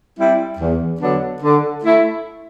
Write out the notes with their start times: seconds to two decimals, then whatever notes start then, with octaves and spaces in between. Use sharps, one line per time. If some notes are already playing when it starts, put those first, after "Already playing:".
0.18 G3 C4 E4
0.59 E2
1.01 D3 F#3 B3 D4
1.43 D3
1.84 A3 E4